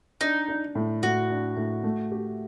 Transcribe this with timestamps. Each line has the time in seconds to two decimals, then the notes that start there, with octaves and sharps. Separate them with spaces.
0.21 D4 D#4
0.48 D4
0.75 A2
1.02 A2 F#4
1.30 D4
1.56 A2
1.83 A3
2.11 G4